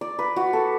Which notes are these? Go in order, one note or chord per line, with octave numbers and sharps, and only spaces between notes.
D5
B4
F#4
A4